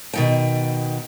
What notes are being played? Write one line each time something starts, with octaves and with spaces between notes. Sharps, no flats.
B2 D#3 G5